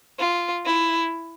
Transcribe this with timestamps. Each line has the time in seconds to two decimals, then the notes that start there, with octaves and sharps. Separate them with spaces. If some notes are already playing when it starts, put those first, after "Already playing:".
0.19 F4
0.66 E4